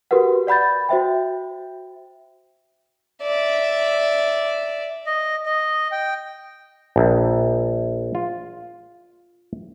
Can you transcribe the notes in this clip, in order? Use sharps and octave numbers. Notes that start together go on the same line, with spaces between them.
F#4 G4 A#4 B4 F#5
D5 F#5 B5 G6 A6
F#4 C5 E5 G5
D5 E5
D#5
D#5
G5
A#1
F4